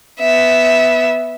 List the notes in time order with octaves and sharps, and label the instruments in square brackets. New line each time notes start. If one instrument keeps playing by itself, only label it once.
[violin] B3 E5